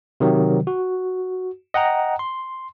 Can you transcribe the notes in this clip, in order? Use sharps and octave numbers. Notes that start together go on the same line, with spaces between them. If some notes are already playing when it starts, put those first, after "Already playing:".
C3 D#3 F#3
F#4
D#5 F#5 G5 A#5
C6